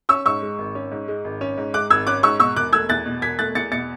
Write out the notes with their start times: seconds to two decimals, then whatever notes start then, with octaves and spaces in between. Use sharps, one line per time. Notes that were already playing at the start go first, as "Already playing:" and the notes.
0.09 C#4 C#6 E6
0.25 G#2 C#6 E6
0.42 G#3
0.58 G#1
0.75 C#4
0.92 G#2
1.08 G#3
1.25 G#1
1.41 C#4
1.58 G#2
1.74 G#3 D6 F#6
1.90 G#1 E6 G#6
2.07 C#4 D6 F#6
2.23 G#2 C#6 E6
2.40 B2 C#6 E6
2.56 E1 D6 F#6
2.73 A3 E6 G#6
2.89 E2 F#6 A6
3.06 B2
3.22 E1 G#6 B6
3.39 A3 F#6 A6
3.55 E2 A6 C#7
3.71 B2 A6 C#7